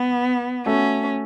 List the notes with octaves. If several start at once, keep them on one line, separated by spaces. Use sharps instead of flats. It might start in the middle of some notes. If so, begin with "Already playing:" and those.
Already playing: B3
A3 C#4 F#4 A4